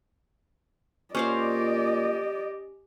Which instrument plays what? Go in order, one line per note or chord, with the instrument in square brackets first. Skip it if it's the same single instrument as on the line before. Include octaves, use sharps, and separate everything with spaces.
[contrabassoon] A#2 [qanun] C#4 C5 F5 [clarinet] G4 [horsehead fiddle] D5 D#5